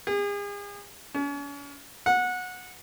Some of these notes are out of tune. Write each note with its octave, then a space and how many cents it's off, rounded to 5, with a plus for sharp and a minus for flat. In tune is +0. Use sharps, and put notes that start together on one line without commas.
G#4 -40
C#4 +40
F#5 -20